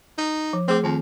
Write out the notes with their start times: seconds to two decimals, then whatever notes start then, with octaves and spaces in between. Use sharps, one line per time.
0.18 D#4
0.53 F3
0.68 A3 C4 G#4 D6
0.84 F2 D#3 C4